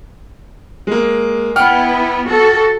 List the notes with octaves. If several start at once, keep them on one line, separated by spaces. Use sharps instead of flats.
G#3 A#3
B3 E4 F#5 G5 F6
F#4 A4